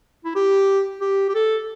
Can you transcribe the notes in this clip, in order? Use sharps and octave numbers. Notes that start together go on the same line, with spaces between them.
E4
G4
G4
G4
A4